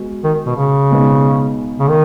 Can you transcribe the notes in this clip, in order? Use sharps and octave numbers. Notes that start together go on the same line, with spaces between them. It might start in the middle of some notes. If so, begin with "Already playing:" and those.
Already playing: G#3 B3 F#4
D#3
B2
C#3
B2 G#3 B3 D#4
C#3
D#3